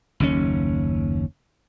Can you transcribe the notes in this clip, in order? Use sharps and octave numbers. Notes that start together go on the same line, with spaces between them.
F#1 D#2 C#4